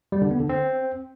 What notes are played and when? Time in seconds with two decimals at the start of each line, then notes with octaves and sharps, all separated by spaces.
0.12 G3
0.22 D3
0.31 B3
0.40 D3
0.49 C4